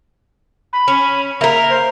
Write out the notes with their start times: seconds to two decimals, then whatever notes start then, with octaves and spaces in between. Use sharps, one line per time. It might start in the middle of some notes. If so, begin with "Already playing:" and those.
0.73 B5
0.88 C#4
1.41 A#3 A#4 E5
1.69 C5